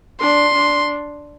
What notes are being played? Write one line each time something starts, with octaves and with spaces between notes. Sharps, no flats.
D4 C6
D4